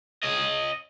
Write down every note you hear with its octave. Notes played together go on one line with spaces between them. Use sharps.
C#5 D#5